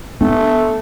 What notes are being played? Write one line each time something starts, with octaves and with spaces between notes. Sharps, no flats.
A3 B3 D4